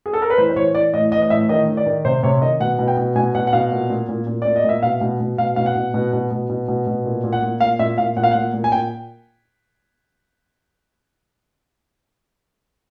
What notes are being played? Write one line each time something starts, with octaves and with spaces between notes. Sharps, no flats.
G#4
A4
A#4
B4
E3 C5
C5
E3 C#5
E3 D5
A2 D#5
E3 D#5
D#5
A2 E5
D#3 D#5
D#3
D5
D#3
C3 C5
C3 C#5
D#3 D#5
B2 F#5
B2
G5
B2
B2 G#5
B2 F#5
F#5
B2 F5
A#2
A#2
A#2
A#2
A#2 D5
D#5
A#2 E5
B2 F5
B2
B2
B2 F5
B2 F5
F#5
B2
B2
B2
B2
B2
B2
B2
A#2
A#2
F#5
A#2
A#2 F5
A#2 E5
A#2 F5
A#2 F#5
F5
A#2 F#5
A#2
G#5
A#2 G5